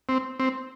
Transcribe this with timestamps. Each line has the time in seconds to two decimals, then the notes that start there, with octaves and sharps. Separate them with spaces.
0.09 C4
0.40 C4